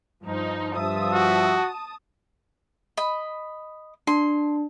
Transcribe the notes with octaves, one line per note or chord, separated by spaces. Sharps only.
G2 F3 D#4
G2 F3 E5 A5 D#6
F#4
D#5 B5
D4 C6